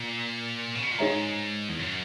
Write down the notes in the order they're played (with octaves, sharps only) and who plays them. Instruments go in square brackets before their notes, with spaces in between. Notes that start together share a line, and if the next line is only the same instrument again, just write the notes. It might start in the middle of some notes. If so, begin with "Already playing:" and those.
Already playing: [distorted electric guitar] A#2
C#3
B2
A#2
[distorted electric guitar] G#2 [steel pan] D#4 G#4 C#5 E5 A#5
[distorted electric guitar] E2
F#2